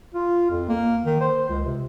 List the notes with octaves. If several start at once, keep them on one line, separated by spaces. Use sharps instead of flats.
F4
F2
A#3
D#3
C5
C#2
C3